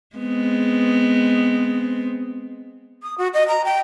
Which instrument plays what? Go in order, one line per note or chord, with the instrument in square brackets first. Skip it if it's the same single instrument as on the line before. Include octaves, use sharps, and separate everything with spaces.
[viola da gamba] G#3 B3 C4
[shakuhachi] D#6
F#4
D#5
A#5
G5